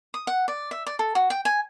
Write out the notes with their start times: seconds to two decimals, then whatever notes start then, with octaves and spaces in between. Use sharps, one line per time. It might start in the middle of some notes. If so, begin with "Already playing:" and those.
0.14 D#6
0.27 F#5
0.48 D5
0.71 E5
0.86 D5
0.99 A4
1.15 F#4
1.30 G5
1.45 G#5